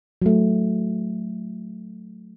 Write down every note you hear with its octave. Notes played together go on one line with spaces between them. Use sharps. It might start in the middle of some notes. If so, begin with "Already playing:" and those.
F#3 A3